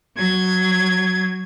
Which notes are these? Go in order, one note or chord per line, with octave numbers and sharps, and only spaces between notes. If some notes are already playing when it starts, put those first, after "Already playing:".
F#3 G#6